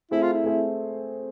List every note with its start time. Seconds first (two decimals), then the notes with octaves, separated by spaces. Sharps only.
0.11 A3 C4 E4 G#4 C5
0.22 F4
0.33 E4
0.44 A3 C4 G#4 C5